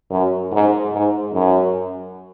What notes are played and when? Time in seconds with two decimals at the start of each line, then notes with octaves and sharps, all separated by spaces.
0.10 F#2
0.51 G#2
0.92 G#2
1.33 F#2